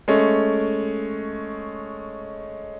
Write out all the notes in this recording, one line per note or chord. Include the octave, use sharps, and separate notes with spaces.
G#3 A3 C#4